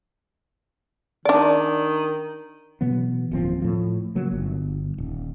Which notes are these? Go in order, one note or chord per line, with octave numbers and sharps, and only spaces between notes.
D#3 D4 D5
B2 E3 F#3 B3
D1 D#2 F3 C4
A2 F3
C#3 F#3 A#3
G1
D#1